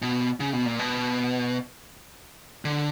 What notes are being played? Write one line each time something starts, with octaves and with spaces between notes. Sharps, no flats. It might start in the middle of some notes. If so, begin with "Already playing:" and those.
B2
C#3
B2
A#2
B2
D3